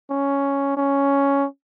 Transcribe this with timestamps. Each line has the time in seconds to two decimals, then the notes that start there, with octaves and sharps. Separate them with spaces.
0.10 C#4
0.77 C#4